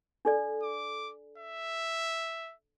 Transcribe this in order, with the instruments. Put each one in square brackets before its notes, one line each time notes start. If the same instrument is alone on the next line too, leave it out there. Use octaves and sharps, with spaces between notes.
[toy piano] D4 A4 D5
[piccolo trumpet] D6
E5